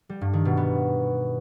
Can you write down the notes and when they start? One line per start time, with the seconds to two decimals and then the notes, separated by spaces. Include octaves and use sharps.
0.09 G3
0.21 G2
0.33 D#3
0.45 B2
0.57 B3